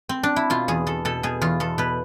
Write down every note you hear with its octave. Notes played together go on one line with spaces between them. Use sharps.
C4
D4
E4
B2 F4
E2 G#4
E2 A4
B2 A4
B2 G#4
E2 F4
E2 A4
B2 B4